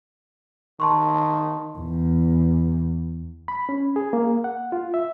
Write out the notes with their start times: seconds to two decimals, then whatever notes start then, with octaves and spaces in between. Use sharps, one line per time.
0.80 D#3 A5 C6 C#6
1.78 E2
3.48 B5
3.69 C#4
3.96 G#4
4.13 A#3
4.44 F#5
4.72 F4
4.94 E5